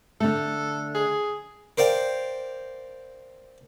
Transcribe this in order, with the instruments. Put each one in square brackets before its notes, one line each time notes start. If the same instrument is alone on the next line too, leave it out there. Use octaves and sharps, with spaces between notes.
[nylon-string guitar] D3 A3 [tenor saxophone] A4
[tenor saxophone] G#4
[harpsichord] A#4 C5 D5 F5 G5